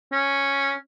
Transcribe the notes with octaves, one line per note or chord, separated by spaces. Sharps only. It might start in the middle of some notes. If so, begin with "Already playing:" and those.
C#4